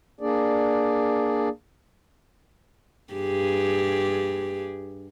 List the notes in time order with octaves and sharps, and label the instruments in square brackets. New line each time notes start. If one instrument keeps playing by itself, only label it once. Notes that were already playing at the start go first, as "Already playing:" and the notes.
[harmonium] A#3 D4 G#4 D5
[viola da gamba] G2 G4 G#4